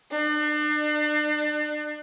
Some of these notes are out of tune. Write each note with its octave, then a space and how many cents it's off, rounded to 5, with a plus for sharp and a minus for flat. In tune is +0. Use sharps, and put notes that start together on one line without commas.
D4 +40